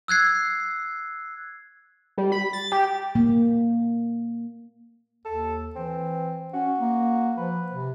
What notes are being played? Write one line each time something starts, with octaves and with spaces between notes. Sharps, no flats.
E6 F#6 G#6 C7
G3
B5
A6
G4
A#3
D#2 A4
E3 C4
C#4 F#4
A#3
F3 B4
C3